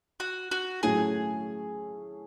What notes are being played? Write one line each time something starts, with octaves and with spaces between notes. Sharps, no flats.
F#4
F#4
A2 F#3 A3 C#4 G#4